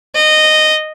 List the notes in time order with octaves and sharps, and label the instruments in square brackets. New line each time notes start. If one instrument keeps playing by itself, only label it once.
[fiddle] D#5